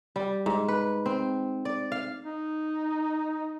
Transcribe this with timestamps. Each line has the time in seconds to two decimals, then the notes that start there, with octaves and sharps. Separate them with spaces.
0.16 G3
0.46 G#2
0.68 B4
1.06 C4
1.65 D5
1.92 F5
2.24 D#4